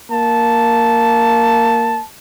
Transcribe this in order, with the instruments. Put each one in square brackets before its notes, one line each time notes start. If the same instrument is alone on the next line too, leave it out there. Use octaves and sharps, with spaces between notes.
[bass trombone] A#3 [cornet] A5